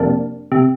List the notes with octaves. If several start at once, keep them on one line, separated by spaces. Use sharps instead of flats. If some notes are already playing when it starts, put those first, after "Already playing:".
Already playing: F2 C3 A#3 D4
C3